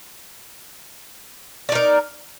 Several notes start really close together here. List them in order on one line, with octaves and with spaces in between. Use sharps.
D5 D#4 A#4